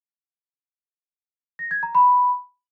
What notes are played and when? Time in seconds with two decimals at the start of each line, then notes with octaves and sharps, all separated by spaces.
1.59 A#6
1.71 G#6
1.83 A#5
1.95 B5